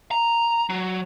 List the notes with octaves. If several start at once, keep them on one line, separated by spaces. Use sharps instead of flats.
A#5
F#3